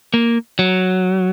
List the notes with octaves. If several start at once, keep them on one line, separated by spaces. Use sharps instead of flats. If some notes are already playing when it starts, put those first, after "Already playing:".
A#3
F#3